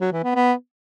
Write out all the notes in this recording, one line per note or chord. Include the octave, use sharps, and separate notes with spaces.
F#3
E3
B3
B3